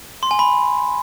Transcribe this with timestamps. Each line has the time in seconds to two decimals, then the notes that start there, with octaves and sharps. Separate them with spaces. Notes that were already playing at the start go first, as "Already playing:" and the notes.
0.23 C6
0.31 G#5
0.39 B5